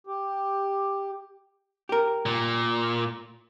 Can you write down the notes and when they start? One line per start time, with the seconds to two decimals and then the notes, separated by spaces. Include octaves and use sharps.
0.07 G4
1.89 G4 A#4
2.26 A#2